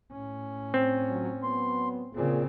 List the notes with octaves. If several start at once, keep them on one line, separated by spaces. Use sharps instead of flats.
A2 C#4
C4
F3 F#3
F#3 B3 C6
A#2 C#3 C4 G#4